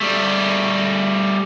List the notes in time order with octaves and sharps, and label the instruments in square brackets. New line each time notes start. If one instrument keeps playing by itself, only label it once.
[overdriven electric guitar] G3 A3